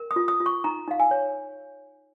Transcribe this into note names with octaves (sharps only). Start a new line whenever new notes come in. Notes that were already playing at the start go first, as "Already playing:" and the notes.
Already playing: A#4
D#6
F4
D#6
F4
C#6
D#4 A#5
D#4 F5
G#5
C#5